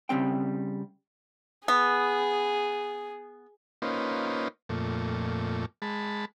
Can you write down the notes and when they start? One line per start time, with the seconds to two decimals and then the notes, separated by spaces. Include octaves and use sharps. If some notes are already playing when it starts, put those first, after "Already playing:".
0.09 C#3 G3 C4 G5
1.68 B3 G#4
3.82 A#3 C#4 D#4 F4 B4 C5
4.69 F2 A#2 A3
5.82 G#3 A5 B5